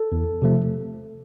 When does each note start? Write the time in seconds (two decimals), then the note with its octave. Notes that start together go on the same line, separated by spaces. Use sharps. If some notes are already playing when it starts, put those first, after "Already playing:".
Already playing: A4
0.12 E2
0.42 C3 F3 A3